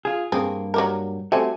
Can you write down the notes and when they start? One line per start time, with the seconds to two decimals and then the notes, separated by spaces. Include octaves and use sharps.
0.05 F4 G#4
0.32 G2 A#3 C4 G#4
0.74 F#3 G3 A#4
1.32 G3 A3 C4 F#4 G#5